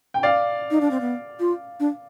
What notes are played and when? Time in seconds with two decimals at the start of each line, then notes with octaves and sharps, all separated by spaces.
0.14 G5
0.23 D5 F5
0.71 D#4
0.81 D4
0.91 C4
1.01 B3
1.40 F4
1.80 D4